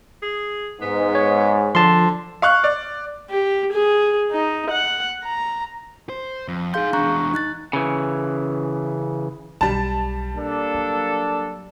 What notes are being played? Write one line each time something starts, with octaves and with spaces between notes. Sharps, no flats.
G#4
G#2 B3
C#5
D3 F3 A5 C6
F5 C#6 F#6
D5
G4
G#4
D#4
F#5
A#5
C5
F2
D#4 G#4 F5 C6 G6
E2 D4 A#5 C#6 F#6
D#4 F#6 A6
C#3 E3
B1 G3 A5
A#3 D4 A4
F#3